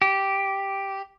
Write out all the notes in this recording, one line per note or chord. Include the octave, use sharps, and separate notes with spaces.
G4